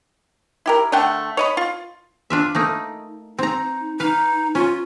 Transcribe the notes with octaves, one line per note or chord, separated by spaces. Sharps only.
E4 G4 A#4
D3 A3 F#5 G5
C#5 D#5 B5
F4
D4 F4 E5
A3 A#3 D#4
C4 D#4 A#5
D#4 B4 F5
C#4 F4